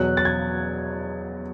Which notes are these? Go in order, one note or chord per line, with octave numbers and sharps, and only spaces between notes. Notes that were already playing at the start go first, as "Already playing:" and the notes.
Already playing: E2 B2 F#3 F#6
A6
G#6